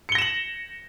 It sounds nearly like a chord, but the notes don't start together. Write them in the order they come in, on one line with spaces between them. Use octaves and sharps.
C#7 G7 A#6 E7 F#7